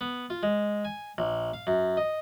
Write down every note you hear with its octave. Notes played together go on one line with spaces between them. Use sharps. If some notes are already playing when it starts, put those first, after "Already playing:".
B3
F4
G#3
G#5
A#1
F5
F#2
D#5